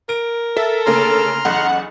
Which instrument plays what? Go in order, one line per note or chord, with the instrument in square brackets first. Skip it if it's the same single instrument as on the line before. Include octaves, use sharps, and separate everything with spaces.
[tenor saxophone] A#4 [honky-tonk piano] D7
[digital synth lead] A4 [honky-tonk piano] E5
[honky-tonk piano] D2 C#3 A#3 [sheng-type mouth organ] A#5 C6 F6
[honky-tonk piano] F#1 B1 E2 [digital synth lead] F#5